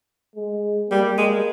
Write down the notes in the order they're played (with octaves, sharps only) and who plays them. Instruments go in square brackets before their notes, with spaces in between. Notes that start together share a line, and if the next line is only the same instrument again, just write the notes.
[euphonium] G#3
[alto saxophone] G3 [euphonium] A#3
[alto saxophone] G#3